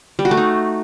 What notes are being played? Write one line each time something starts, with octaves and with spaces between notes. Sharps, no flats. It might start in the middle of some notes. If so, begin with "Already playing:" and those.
G3
F#4
A3
D#4